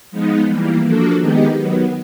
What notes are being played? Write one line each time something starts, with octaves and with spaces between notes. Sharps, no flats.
F3 G#3 B3 D#4
E3 G3 A#3
F3 A#3 D4 F#4 A4
D#3 G#3 B3 D#4 G4
D#3 F#3 B3